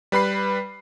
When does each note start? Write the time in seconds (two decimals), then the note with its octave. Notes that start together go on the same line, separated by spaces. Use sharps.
0.12 G3 B4 B5 C7